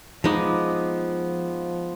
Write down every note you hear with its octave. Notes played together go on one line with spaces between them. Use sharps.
F3 G#3 B3 D#4 D6